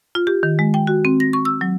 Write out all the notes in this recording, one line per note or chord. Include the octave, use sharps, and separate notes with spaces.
F4
G4
D#3
G#3
G5
F#4
C4
A#6
C#6
E6
F#3